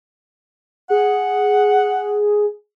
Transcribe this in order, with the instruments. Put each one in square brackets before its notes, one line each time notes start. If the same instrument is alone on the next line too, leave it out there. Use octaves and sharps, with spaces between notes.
[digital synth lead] G#4 [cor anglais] F#5